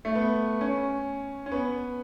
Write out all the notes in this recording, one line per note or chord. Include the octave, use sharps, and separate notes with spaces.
A3
B3
C#4
C#4
B3